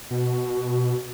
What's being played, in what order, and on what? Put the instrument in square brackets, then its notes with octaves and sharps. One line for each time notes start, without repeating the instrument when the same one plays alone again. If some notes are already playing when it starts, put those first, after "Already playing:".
[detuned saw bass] B2 [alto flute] F#4